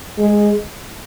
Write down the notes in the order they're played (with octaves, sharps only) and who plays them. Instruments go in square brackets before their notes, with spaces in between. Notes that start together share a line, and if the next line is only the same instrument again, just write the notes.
[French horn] G#3